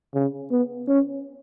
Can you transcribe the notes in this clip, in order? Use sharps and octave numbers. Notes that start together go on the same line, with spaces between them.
C#3
B3
C#4